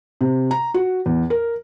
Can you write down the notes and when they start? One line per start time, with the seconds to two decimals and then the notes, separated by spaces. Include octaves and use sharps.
0.21 C3
0.51 A#5
0.74 F#4
1.06 E2
1.30 A#4